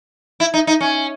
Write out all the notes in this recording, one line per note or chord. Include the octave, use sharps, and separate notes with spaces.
E4
D#4
D#4
C#4